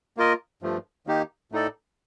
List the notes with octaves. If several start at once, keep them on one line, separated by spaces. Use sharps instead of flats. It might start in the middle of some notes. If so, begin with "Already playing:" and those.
A#3 F4 A#4 D#5
G2 F3 A3
D#3 A#3 D#4 G4
A2 A3 D#4 A4 D5